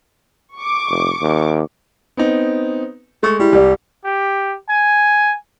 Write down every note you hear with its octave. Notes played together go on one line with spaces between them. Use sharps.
C#6 D6
F1
D#2
B3 C4 D#4
G#3 A3 C#6
G3 E4
C2 G4 D5
G4
G#5